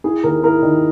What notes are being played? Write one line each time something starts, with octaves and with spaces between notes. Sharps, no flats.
E4 G#4
D#2 A#4
E4 A#4
D#3